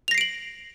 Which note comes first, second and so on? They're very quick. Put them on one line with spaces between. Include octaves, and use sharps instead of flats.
F7 A#6 C7 D7 F#7